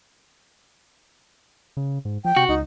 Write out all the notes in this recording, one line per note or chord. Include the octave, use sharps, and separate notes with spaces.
C#3
G#2
F3 G5
C3 F#4
C#2 D#4